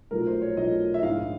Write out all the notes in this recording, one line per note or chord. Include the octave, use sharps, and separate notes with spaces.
B1 A#2 F3 A3 A#4
C5
C#5
B1 A#2 F3 A3 D#5
E5
A#1 G#2 D#3 F5